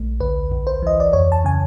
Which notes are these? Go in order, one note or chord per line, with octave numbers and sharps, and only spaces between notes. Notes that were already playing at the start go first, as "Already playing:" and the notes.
Already playing: A#1 A3
D2 B4
D2
C5
E3 D#5
D5
F2 C#5
A5
C#3 G#5